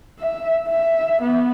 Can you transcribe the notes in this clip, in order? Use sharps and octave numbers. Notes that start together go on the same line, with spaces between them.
E5
E5
B3